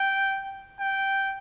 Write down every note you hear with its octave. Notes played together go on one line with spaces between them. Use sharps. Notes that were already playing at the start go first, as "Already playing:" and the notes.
Already playing: G5
G5